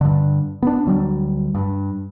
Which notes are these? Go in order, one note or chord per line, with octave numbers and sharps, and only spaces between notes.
G2 D3
B3 D4
D2 F#3 G3
G2